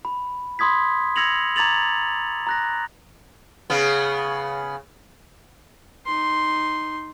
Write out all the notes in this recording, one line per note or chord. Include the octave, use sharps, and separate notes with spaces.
B5
B5 C6 D#6 G#6 B6
E6 G#6 A#6 C#7 F7 F#7
A#5 D6 G#6 A6 F7 F#7
A#5 F#6 A#6
C#3 B3
D#4 C6